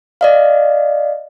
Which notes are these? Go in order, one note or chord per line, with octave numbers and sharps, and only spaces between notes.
D5 D#5 F5